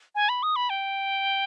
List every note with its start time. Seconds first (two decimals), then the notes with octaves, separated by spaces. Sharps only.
0.15 G#5
0.29 B5
0.43 D#6
0.56 B5
0.70 G5